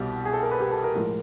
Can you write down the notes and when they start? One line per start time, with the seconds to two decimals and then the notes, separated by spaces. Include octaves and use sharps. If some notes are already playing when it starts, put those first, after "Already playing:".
Already playing: C2 B2 G3 G4
0.25 G#4
0.33 A4
0.43 A#4
0.51 B4
0.60 G4
0.72 A4
0.84 A#4
0.95 A2 F3 G#3 A#4